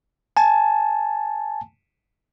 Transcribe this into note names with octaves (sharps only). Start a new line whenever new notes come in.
G#5 A5